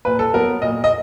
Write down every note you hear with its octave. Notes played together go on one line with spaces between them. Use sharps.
A#2 B4
A4
F#3 B3 A#4
A#2 D#5
D#5